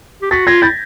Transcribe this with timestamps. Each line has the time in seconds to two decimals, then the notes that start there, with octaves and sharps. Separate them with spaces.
0.22 G4
0.31 F#4 A6 B6
0.46 F4 G#6 A#6
0.62 E4 G6 A6